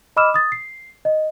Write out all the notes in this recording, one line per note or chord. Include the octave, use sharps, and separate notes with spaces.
D#5 B5 D6 E6 F6 E7
D#6 A6
C7
D#5